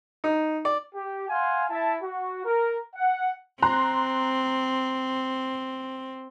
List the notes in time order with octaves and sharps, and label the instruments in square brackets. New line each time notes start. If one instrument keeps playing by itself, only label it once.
[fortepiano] D#4
D5
[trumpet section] G4
F5 F#5 G#5 C6
E4 E5 A5
F#4
A#4
F#5
[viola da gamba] C4 [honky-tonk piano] A#5 C6 F#6